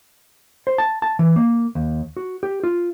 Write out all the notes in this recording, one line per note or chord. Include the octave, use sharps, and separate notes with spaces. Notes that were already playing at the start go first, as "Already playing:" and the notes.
C5
A5
A5
E3
A#3
D#2
F#4
G4
F4